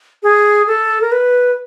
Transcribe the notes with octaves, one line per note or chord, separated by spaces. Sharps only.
G#4
A4
A#4
B4